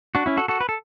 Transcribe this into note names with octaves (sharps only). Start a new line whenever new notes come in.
D4 F#4
C#4 E4
F#4 A4
F#4 A4
B4
A4